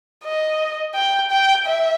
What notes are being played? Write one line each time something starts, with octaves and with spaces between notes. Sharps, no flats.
D#5
G5
G5
E5